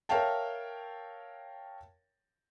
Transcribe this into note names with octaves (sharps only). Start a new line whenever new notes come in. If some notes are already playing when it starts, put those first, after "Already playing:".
A#4 C#5 E5 F5 G5 A5